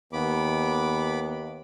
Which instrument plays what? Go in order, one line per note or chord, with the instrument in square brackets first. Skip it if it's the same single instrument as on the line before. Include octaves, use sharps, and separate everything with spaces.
[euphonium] D#2 [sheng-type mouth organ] B3 B5 D6